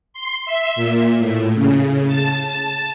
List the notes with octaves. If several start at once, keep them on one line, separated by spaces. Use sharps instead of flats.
C6
E5
A#2
A2
C#3
A5